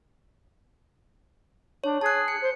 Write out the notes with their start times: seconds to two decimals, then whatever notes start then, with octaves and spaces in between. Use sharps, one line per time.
1.84 D4 C#5
2.01 G#4 A5 F#6
2.28 C#7
2.41 C5